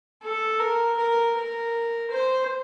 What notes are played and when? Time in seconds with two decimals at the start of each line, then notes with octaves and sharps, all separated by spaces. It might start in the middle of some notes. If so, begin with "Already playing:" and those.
0.23 A4
0.60 A#4
0.97 A#4
1.36 A#4
2.11 C5